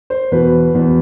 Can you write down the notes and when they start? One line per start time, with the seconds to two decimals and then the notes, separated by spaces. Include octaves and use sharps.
0.10 C5
0.31 E2 B2 B4
0.74 E2 B2